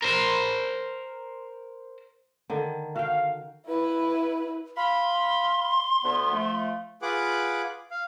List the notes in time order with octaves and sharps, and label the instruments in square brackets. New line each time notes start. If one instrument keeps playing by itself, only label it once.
[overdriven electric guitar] A#4 C5
[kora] D3 D#3
[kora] F#4 G5 [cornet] F5
[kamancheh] E4 B4
[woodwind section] F5 B5 [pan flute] C6
[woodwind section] D2 B3
F3 A3
[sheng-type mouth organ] F4 G#4 B4 F#5 D6
F5